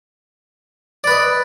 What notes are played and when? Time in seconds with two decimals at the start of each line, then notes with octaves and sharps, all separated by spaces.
1.04 D5
1.07 B4
1.11 D#5